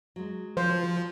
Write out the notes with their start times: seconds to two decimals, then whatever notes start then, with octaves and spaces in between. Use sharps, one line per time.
0.16 F#3 G#3
0.57 F3 C5